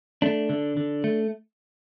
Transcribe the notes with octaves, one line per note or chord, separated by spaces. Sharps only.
A3 D4
D3
D3
A3